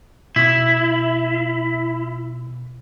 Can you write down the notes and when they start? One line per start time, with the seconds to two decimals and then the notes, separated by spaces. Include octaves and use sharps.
0.36 B2 E4